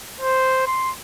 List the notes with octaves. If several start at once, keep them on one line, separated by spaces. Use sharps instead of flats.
C5
C6